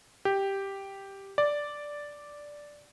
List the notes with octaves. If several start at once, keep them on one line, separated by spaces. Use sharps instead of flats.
G4
D5